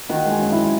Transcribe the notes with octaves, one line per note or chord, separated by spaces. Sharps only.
D#3 F#4
G#3
G#4
F#2
E4